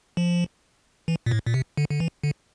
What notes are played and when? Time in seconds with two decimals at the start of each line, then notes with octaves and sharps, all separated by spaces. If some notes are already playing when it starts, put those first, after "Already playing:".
0.17 F3
1.08 E3
1.26 A#2
1.31 A2
1.46 A#2
1.54 C3
1.77 D3
1.90 D3
2.00 E3
2.23 D3